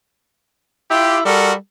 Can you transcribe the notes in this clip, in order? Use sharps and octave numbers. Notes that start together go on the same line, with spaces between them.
E4 F4 G4
G3 F#4 A4 A#4